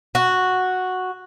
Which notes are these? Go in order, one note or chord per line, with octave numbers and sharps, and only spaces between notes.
F#4